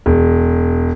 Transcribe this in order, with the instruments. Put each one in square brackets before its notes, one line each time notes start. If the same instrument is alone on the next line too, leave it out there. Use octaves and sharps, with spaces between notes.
[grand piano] E1